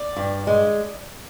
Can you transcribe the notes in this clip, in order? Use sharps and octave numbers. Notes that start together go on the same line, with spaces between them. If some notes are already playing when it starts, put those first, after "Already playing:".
Already playing: D5
G2
G#3